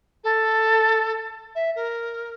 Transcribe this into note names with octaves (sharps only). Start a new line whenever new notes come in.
A4
E5
A#4